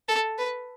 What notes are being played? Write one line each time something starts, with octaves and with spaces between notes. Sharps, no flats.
A4
B4